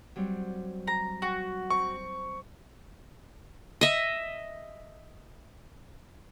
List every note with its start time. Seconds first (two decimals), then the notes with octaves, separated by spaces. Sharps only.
0.16 F#3 G3 C4
0.87 A#5
1.22 F#4
1.70 C4 C#6
3.81 D#5 E5